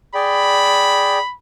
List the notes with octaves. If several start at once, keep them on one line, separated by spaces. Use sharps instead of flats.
G#4 D5 G5 B5